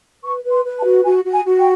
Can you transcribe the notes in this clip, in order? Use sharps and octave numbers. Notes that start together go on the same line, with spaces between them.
B4 C#6
B4
C6
B4
A5
F#4
F#4 G#5
F#4
G#5
F#4
G5